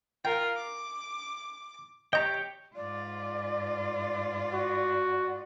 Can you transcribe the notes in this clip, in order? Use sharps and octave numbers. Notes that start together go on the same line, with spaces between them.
F4 A#4 G5
D6
G4 C#5 D#5 G5 A#5
G#2 F4 D5
F#4